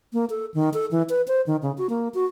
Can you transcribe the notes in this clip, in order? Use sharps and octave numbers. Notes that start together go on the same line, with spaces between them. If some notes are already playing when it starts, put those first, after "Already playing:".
A#3
A4
D#3
A4
E3
B4
C5
D#3
C#3
F#4
A#3
F#4